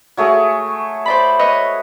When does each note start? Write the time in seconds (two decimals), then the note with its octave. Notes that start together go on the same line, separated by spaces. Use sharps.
0.17 F#3 A3 G#4
1.06 C5 D5 B5
1.39 B4 C#5 D#5